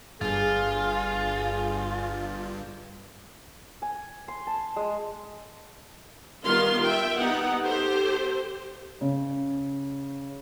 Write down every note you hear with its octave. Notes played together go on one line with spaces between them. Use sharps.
G1 G2 F4 G#4
G#5
C6
A5
G#3
D#3 G3 B3 F4 F5 C6
E5 G5
B3 D#4 G4 F#5
G4 A4 C5
C#3